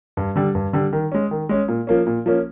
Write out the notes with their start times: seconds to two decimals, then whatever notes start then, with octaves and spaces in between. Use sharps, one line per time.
0.17 G2
0.36 D3 G3
0.55 G2
0.73 D3 G3
0.93 D#3
1.12 G#3 C#4
1.31 D#3
1.49 G#3 C#4
1.68 A#2
1.87 F3 A#3 C#4
2.07 A#2
2.26 F3 A#3 C#4